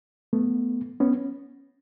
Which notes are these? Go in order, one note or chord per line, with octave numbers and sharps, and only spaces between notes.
A3 B3
B3 C#4